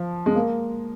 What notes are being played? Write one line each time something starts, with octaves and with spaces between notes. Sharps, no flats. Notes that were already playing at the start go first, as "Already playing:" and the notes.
Already playing: F3
G#3
A#3